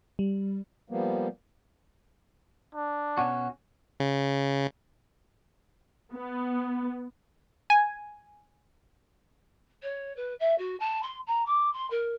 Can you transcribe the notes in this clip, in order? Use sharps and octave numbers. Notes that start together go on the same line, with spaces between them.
G3
F3 G3 A#3 B3
D4
B2 C#4 F#4
C#3
B3
G#5
C#5
B4
E5
F#4
A5
C6
A#5
D6
C6
A#4